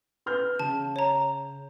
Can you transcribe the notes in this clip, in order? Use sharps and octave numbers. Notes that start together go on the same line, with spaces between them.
B4 F6 G6
C#3 A5
C#5 A#5